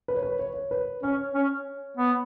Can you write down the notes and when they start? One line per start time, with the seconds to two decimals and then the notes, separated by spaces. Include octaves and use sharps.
0.08 B4
0.15 C#5
0.23 B4
0.39 C#5
0.54 C#5
0.71 B4
1.03 C#4 C#5
1.35 C#4
1.97 B3